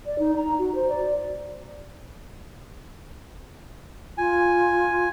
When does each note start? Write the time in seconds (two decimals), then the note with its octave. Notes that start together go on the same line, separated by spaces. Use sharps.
0.06 D5
0.19 D#4
0.36 A#5
0.59 F#4
0.75 C5
0.89 D5
4.18 F4 G#5